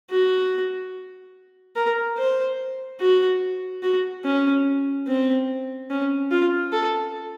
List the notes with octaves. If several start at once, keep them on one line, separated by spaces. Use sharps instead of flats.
F#4
A#4
C5
F#4
F#4
C#4
C4
C#4
F4
A4